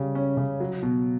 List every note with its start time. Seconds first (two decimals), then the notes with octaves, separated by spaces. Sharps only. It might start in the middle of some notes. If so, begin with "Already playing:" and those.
Already playing: C#3 G3
0.15 C#4
0.37 C#3
0.60 F#3
0.82 B2